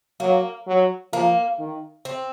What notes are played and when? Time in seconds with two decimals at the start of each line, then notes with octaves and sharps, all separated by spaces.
0.20 F#3 A#3
0.67 F#3
1.12 F3 A#3
1.59 D#3
2.05 C4